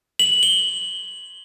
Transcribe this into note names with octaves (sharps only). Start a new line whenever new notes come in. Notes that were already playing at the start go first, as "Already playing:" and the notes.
F#7
G7